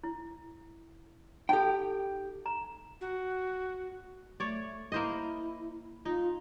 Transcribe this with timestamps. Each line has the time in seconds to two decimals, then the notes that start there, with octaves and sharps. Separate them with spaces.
0.04 E4
1.49 D#4 G4 A4 G5
2.46 A#5
3.01 F#4
4.40 A3 C#5 D5
4.92 A#3 E4 C5 D#5
6.05 D#4 F4